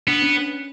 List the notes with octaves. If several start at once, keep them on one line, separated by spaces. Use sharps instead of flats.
B3 D4
C#4